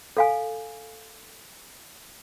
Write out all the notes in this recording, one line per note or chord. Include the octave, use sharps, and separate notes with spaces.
A4 F5 G#5